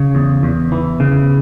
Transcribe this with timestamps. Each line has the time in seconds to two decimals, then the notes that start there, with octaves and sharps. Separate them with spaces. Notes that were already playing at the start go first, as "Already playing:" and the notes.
Already playing: C#3
0.15 E2
0.43 E2
0.72 E3
1.00 C#3